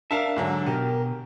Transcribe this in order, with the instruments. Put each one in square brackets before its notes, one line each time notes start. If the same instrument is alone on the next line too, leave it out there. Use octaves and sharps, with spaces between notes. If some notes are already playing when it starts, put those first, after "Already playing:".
[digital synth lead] D4 [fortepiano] A#4 A5 [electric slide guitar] E5 F5
[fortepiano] G#2 D3 F#3
[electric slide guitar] B2 [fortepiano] G4 [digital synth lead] A#4